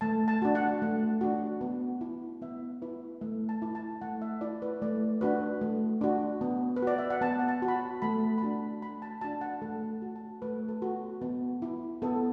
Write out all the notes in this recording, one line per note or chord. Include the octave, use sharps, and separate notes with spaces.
A3 A5
A5
D4 F#4
F#5
A3
D4 F#4
B3
E4
B3 E5
E4 B4
A3 E5
A5
E4
A5
A3 F#5
E5
E4 D5
B4
A3 D5
D4 F#4 B4
A3
D4 F#4
B3
B4
F#4 D5
E5
F#5
B3 A5
F#5
A5
F#4
B5
A5
A3 B5
B5
D4 F#4 A5
A3 B5
A5
D4 F#4 A5
F#5
A3 A4
F#4
A5
A3 B4
A4
F#4
B3
E4
B3 A4